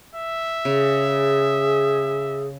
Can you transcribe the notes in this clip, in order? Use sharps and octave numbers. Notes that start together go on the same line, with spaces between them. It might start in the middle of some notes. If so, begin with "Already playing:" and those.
E5
C#3 G#4